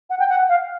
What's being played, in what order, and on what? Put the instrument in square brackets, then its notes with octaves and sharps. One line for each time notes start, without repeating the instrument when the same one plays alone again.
[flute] F#5
G5
F#5
F5